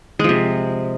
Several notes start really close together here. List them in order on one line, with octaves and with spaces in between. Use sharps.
G#3 F3 C3